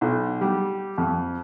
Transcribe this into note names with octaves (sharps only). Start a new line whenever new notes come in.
B1
G3
F2